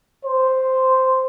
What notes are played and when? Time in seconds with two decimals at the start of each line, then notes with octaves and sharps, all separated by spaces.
0.25 C5